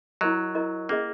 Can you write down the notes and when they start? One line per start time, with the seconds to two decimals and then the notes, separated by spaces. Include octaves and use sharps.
0.21 F#3 E4 A#4 D#5
0.55 E4 A#4 D#5
0.89 A#3 C#4 G#4 D#5